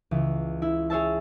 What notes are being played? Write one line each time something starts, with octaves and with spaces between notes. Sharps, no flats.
C#2 E3
E4
G#4 C#5 E5 A5